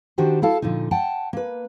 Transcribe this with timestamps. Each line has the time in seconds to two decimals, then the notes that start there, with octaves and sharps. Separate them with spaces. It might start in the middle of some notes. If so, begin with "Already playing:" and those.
0.18 D#3 D4 F#4 G4 C5
0.42 E4 F#4 A4 F5 A5
0.62 A#2 D3 F3 D#4
0.91 F#5 G5 A5
1.33 A#3 B4